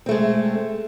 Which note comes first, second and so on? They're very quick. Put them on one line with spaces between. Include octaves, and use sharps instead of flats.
C4 A3 G#3